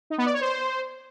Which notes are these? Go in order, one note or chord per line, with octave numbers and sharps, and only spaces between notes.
D#4
B3
D5
C#5
C5